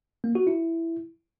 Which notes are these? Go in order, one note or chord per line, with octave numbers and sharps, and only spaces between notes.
A#3
F#4
E4